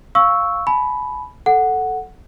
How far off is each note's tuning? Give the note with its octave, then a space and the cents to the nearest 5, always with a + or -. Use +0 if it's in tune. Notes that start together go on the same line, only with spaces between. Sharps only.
F5 +0 C#6 +0 E6 -5
G#5 +45 B5 +0
A4 +0 F#5 +0